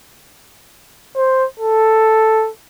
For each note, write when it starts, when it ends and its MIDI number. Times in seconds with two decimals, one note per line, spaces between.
1.16 1.46 72
1.60 2.51 69